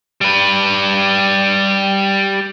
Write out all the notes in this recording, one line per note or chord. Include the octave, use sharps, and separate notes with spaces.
G3 B4